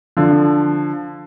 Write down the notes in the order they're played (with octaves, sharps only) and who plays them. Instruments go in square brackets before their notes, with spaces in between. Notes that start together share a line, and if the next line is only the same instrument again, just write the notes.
[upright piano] D3 F3